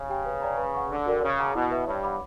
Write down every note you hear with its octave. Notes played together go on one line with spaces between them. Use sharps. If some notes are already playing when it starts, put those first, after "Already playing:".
Already playing: C#3
G4 C#5 G5
B4
D5 G5 A#5
B4
F#5 C#6
D3 D4
F#4 A#4 D5 G5
C#3 C#5
F#5 A#5 D6
B2 E4
B4 E5
G2 C#5
F#5 B5 D6